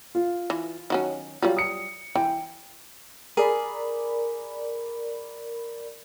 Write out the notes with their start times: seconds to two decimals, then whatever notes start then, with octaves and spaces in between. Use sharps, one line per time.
0.15 F4
0.50 E3
0.90 D#3 F#3 C#4
1.42 F#3 G3 F4
1.57 D#6 C#7
2.15 E3 G5
3.37 G#4 A#4 D5 B5